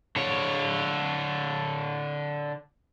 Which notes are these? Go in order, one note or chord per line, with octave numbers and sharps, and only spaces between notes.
D3 C#5